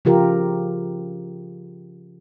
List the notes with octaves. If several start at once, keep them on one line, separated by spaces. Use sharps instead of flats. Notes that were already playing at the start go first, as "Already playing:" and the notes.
C#3 F3 F4 G4 A#4